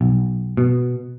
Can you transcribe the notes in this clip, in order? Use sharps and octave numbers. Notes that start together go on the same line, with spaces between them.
B1
B2